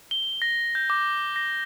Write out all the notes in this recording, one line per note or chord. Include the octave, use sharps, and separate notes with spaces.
G7
A#6
G6
D6
A#6